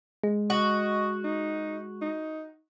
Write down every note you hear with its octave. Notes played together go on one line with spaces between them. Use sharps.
G#3
F#4 D#5
D#4
D#4